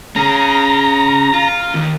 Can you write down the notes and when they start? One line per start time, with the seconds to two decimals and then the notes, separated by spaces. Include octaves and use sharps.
0.16 C#4 G#4 A#5
1.34 F4
1.74 D#2 D#3